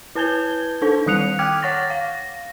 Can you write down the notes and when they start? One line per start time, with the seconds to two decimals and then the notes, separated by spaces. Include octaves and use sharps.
0.15 E4 B4 A5 G6 G#6 G7
0.82 D4 D#4 A4 C5
1.06 D#3 G3 D#6 F#6 C#7 F7
1.39 G5 D6 F6 F#6 G#6
1.62 C#5 F#5 C#6 A6 A#6
1.90 F5 A#6